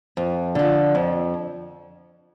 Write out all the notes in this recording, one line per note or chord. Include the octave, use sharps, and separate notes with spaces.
F2
D3 F3
F2